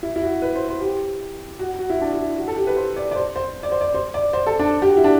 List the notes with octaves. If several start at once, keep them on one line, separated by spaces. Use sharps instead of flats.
E4
E4
F#4
B4
C5
C5
G4
F#4
F#4
E4
D4
E4
F#4
A4
G4
B4
C5
D5
D5
C5
C5
D5
C5
D5
C5
D5
C5
A4
D4
G4
F#4
E4
D4